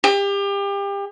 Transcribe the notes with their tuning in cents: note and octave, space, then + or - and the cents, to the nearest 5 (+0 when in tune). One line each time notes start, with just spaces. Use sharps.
G4 +30